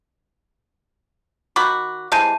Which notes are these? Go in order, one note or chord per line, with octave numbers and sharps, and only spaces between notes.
D#3 F#4 B5 D6
C3 E3 G#3 A5 G6 D#7